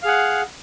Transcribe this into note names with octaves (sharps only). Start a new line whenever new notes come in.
G#4 F5 F#5